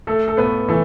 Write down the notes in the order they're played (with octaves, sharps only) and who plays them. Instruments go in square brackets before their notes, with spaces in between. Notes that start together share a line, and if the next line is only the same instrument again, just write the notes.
[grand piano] A3 A4
A4
A2 B3 B4
E3 A3 A4